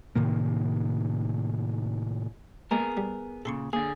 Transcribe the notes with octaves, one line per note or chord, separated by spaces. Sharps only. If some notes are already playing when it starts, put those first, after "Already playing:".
A2 C3 D#3 A#3
G#3 A#3 B3 G#4 A#4
G3
A#2 C#3 A4 C6 C#6
D3 A#3 G#4